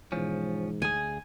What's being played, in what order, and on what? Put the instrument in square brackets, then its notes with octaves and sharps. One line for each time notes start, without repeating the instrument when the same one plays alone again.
[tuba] G#2 [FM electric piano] B2 E3 G#3 [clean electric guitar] F3 C#4
[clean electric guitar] D2 G#4 [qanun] G#5